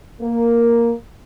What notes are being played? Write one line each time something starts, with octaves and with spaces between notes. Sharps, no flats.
A#3